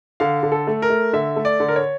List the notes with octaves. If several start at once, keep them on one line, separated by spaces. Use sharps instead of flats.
D3 F5
D3
A4
A3
A#4
A3
D3 E5
A3
D5
D3
A#4
C#5